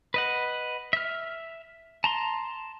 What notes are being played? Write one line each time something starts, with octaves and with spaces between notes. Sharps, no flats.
B4 D#5 F#5
E5 F6
A5 A#5 C6